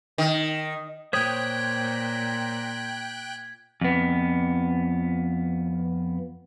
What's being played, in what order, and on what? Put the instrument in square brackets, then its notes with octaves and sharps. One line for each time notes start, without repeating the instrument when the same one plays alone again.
[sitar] D#3
[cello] A#2 [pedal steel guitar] C5 C#5 D#6 [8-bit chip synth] G5 F#6 [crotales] G#6 B6
[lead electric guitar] F2 B3